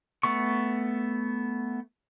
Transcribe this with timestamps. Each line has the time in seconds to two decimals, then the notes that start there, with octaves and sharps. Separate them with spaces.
0.23 A3 B3 C#6